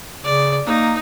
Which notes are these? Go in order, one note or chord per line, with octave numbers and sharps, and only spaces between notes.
C#3 D5
A#3 D#4